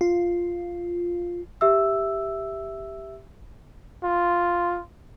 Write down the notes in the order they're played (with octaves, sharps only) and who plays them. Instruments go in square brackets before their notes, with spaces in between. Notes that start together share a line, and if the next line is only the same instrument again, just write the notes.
[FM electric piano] F4
[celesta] G4 E5 E6
[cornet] F4